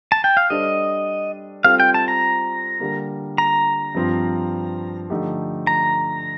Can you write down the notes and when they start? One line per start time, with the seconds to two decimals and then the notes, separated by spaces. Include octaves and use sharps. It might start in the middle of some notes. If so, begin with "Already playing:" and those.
0.12 A5
0.24 G5
0.37 F5
0.50 G3 D4 A4 C5 D#5
1.64 G3 C4 F4 A4 C5 F5
1.80 G5
1.94 A5
2.08 A#5
2.80 D3 G3 A#3
3.38 A#5
3.95 G2 F3 C4 F4
5.10 D3 F3 A3 D#4 G4
5.67 A#5